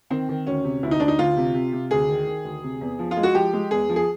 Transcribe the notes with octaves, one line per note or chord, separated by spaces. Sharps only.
D#3 C4
D#3
D2 C#4
C3
D2 E4
D#4
D2 D4
D#4
D2 F4
C3
C3
C3
D2 G#4
D#3
D#3
D2
C3
E2
F3
F4
G#3
F#4
F3 G4
G#3
E2 G#4
F3
G#4